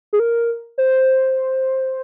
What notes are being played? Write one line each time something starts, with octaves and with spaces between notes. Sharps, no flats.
G#4
A#4
C5